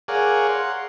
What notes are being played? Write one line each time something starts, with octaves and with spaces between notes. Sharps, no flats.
G#4 A#4 C#5 D5 F5 F#5
F#5 C6